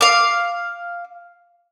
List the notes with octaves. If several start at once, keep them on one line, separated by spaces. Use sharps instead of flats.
F5 D6